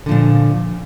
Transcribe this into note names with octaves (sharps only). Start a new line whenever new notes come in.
A#2 D3 F3